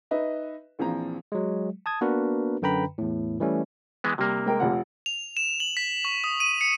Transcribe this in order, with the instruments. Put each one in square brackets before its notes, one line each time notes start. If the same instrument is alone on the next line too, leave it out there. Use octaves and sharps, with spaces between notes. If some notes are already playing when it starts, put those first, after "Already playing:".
[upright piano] D#4 B4 D#5 E5
A#1 E3 F3 C4 A#5
[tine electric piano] F#3 G#3
A5 D#6 G#6
A#3 B3 D4 F#4 A#4 B4
F#2 D3 B4 G5 A#5 B5
E2 A2
E3 G3 A3 C#4
[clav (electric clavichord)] E3 G#3 B3
[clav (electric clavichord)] C3 A#3 [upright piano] G3
[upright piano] G#3 A#4 G5
F1 F4 F#5
[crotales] F7
E7
F#7
B6
C#6
D#6
D#7
C#7